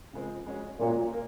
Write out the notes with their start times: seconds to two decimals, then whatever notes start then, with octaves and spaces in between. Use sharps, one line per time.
0.13 C#3 F3 G#3 C4
0.46 G#3 C#4 F#4 C#5
0.79 A#2 G#3 C#4 F#4 C#5
1.12 A#3 A#4